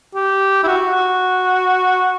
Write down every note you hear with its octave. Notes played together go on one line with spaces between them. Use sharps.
G4
E4
F#4
F#4